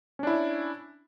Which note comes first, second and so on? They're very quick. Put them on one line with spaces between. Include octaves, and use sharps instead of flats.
C#4 D4 E4